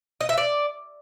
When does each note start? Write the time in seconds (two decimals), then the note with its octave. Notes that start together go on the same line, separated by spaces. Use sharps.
0.21 D#5
0.29 E5
0.38 D5